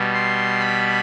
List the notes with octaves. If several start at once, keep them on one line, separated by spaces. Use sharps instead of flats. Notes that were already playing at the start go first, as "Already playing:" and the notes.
Already playing: B2 G3
C6
B5